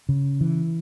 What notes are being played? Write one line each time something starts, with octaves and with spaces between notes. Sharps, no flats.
C#3
E3